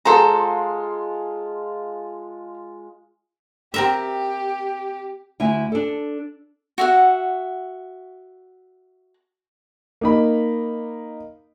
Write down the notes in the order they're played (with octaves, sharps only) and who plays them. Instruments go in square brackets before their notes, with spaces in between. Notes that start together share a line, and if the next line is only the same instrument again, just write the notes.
[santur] G#3 F4 [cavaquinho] A4 C5 A#5
[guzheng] C4 A#4 E5 [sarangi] G4
[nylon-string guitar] D2 E4 E5 G#5
D4 A4
[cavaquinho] F#4 E5 F#5
[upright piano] A#3 D#4 B5